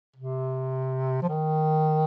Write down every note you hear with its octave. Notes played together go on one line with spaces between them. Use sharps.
C3
F3
D#3